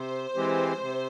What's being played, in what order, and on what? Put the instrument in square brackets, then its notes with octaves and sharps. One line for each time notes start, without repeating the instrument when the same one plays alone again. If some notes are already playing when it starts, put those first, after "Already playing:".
Already playing: [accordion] C3 [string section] C5
[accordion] E3 G#3 C4 G4
C3